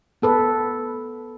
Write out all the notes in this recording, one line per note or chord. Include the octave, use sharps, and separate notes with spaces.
B3 A4 B4